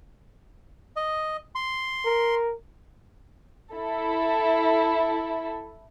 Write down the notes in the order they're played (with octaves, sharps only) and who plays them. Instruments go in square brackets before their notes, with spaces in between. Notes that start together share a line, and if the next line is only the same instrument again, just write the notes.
[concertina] D#5
C6
[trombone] A#4
[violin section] E4 A4